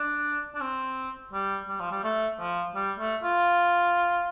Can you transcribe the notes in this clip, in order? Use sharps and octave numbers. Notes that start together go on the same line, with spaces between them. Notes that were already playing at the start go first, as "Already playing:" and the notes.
Already playing: D4
D4
C4
G3
G3
F3
G3
A3
F3
G3
A3
F4